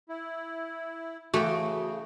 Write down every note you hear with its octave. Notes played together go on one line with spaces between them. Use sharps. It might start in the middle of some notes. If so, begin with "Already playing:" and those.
E4
C#3 E3 A3 B3 F#4 G5